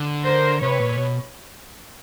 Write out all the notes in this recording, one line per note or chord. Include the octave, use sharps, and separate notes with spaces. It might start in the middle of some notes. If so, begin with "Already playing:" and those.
Already playing: D3
A#4 C5
C3 B4 C#5
A#2
B2